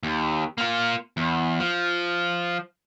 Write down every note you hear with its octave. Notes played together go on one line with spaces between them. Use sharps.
D#2
A#3 F4
E2
F3